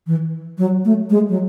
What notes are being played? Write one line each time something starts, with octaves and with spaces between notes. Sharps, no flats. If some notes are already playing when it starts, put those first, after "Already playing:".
E3
F#3
A3
G#3
F#3